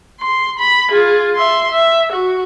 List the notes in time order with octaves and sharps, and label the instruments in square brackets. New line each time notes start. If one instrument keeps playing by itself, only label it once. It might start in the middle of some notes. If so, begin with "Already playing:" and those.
[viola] C6
B5
F4 G#4
E5 C6
E5
F#4